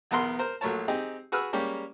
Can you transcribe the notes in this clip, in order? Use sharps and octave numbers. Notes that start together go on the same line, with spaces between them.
B1 E2 B3 A#4 C6
A#4 C5
A#1 F#3 A3 A#4 C#5 A5
C4 D#4 G4 G#4
F#4 G#4 B4 E6 F6
G3 G#3 A#3 C#4 G4